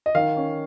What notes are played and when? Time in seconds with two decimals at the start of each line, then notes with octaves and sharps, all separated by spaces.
0.06 D#5
0.15 D#3 F5
0.37 C#4